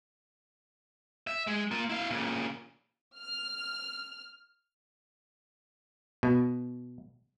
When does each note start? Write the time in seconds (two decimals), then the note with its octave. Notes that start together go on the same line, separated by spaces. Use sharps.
1.27 E5
1.47 G#3
1.71 A#3 F4
1.90 E4 F5
2.10 A#2 C#3
3.19 F6
6.23 B2